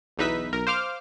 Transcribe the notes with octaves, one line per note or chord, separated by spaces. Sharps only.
B1 E2 D#4 B4 E5 B6
B1 A#4
C5 F5 D6 F6